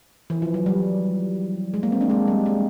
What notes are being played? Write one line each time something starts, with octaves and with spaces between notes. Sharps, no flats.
E3
F3
F#3
G3
G#3
A#3
C4
D4
G#3
G3
G#3